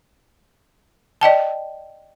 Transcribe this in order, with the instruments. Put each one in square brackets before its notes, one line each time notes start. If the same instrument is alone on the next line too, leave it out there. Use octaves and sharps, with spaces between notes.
[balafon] D5 D#5 G5 A5